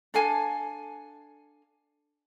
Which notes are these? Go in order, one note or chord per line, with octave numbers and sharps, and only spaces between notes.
D4 A4 F5 G#5